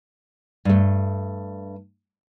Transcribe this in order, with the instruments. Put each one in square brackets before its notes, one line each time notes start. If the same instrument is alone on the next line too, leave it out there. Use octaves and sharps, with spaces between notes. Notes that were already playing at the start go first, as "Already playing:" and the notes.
[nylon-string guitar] G2 A3